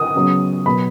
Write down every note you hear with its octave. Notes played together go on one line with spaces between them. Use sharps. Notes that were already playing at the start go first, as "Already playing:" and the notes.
Already playing: D#6
C#3 F#3 B3
B2 F#3 B3 B5